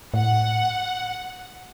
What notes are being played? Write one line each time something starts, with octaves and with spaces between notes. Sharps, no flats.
A2 F#5